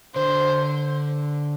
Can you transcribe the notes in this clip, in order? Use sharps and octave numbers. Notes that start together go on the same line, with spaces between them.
D3 C5